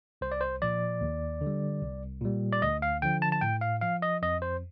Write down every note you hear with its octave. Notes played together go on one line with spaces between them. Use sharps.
C2 C5
D5
C5
A#2 F3 D5
D#2
D3
G3
C2
A#2 G3
D5
D2 D#5
F5
D3 F3 G5
A5
A5
A2 G5
F5
F3 F5
D#5
F2 D#5
C5